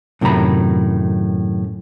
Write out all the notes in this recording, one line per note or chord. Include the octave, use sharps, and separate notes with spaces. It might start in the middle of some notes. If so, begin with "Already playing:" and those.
F#2 A2 C3 D#3 A#5 B5